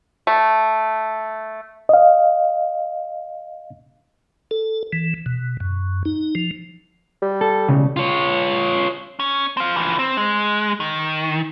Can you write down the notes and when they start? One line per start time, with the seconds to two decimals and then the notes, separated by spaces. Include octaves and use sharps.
0.27 A3
1.89 D#5 F5
4.51 A4
4.93 E3
5.26 B2
5.60 F#2
6.05 D#4
6.35 F3
7.22 G3
7.41 A4
7.69 B1 C#3
7.96 F4 C#5
9.20 C#4
9.57 C4 F4
9.76 E3 F3
9.99 C4
10.17 G#3
10.80 D#3